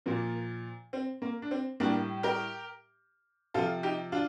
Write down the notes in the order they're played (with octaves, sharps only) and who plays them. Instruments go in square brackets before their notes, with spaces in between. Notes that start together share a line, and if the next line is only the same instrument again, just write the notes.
[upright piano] A#2 F3 A#3
C4
A#3
D4
C4
A2 G3 A#3 D4
G4 A#4
C3 F3 F4 A4
D#4 G4
D4 F4